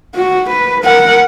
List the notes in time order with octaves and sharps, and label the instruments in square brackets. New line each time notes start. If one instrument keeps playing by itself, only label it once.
[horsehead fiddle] F#4
B4
A#4 F#5